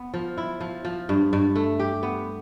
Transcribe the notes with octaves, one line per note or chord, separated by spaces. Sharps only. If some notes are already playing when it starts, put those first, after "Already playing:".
Already playing: B3
F3
E4
F3
F3
G2
G2
A3
G4
B3